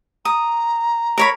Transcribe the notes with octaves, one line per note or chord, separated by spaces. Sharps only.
A#5 D#6
A#4 C#5 B5